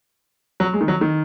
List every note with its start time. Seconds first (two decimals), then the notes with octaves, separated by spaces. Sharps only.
0.60 F#3
0.74 G#3
0.81 D#3
0.88 F#3
1.01 D#3